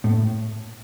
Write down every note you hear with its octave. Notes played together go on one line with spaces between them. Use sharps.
A2